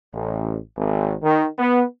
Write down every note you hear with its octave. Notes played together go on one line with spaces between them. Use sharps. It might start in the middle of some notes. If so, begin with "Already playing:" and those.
A1
G#1
D#3
B3